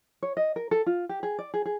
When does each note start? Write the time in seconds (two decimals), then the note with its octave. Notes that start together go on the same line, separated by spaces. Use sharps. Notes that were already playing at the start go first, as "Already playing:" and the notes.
0.22 C#5
0.37 D#5
0.56 A#4
0.71 A4
0.86 F4
1.09 G4
1.23 G#4
1.39 D5
1.54 G#4
1.66 G#4